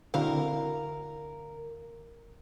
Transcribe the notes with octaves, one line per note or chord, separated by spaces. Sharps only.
D3 C4 E4 F#4 A#4 F5